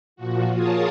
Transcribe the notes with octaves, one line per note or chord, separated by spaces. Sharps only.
A#2 F3 F#4
F4 G#4 A#4 C#5 A5 D#6